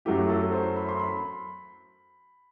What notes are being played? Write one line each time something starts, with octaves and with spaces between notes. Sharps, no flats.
F#2 F#3 A3 E4 G4
A4
C5
B5
C6
B5